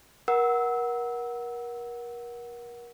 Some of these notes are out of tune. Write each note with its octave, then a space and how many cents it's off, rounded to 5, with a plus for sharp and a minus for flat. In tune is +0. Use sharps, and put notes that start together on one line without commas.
A#4 +35 F#5 +0 E6 -25